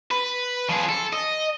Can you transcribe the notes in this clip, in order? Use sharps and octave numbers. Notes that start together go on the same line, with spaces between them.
B4
F3 G#4
A4
D#5